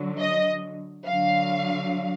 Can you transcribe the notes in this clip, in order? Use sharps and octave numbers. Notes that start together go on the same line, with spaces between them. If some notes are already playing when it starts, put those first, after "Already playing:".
Already playing: D3 F#3
D#5
D3 F#3 F5